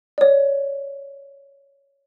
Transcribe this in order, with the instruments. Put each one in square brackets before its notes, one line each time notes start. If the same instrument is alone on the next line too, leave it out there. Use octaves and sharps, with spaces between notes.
[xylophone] C#5 D5